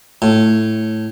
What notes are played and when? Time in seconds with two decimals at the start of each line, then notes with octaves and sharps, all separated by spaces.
0.22 A2